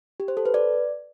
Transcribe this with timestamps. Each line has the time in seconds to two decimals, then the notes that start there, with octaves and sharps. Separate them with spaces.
0.20 G4
0.28 C5
0.37 A4
0.45 B4
0.54 D5